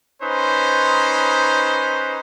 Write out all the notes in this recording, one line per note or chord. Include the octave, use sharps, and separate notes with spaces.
C#4 D#4 B4 C5